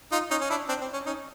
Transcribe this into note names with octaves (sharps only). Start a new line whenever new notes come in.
D#4 F4
C#4 D#4
C#4
D4 E4
C4 D4
C4
C#4
C#4 D#4